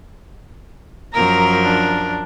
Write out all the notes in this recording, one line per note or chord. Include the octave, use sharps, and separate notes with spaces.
F#2 F3 A#4 A#5
D4